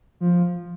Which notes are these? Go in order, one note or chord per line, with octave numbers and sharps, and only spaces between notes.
F3